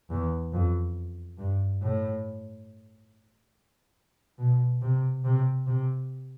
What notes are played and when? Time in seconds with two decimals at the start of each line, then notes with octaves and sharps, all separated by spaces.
0.10 E2
0.52 F2
1.38 G2
1.82 A2
4.38 B2
4.82 C3
5.24 C3
5.67 C3